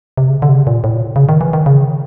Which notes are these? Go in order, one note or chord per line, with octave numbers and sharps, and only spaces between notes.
C3
C#3
D3
C3
C#3
A#2
A2
A#2
B2
C#3
D#3
E3
D#3
C#3